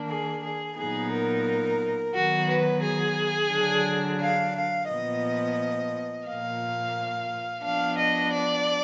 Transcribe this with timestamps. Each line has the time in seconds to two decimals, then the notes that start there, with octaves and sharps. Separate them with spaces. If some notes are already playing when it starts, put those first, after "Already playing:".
Already playing: D#3 A#3 D4
0.08 G#4
0.43 G#4
0.77 A#2 F#3 B3 D#4 G#4
1.11 A#4
2.14 D#3 F#3 B3 F#4
2.49 B4
2.84 G#4
3.52 D3 F#3 D4
4.21 F5
4.55 F5
4.89 A#2 F3 B3 D#5
6.27 A#2 F3 A#3 F5
7.64 F3 B3 D4 F5
7.98 D#5
8.33 D5